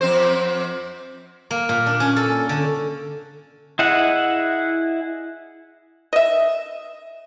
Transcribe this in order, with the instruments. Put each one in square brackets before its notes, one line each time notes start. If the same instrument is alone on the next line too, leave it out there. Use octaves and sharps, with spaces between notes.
[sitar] F2 C4 C5
[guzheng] A#3
A#2
D4
C#4
A4
D3
[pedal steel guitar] E4 G#4 D#5 E5 F#5
[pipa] D#5 E5